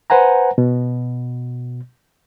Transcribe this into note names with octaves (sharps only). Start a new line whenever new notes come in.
B4 C5 F#5 G#5 A#5
B2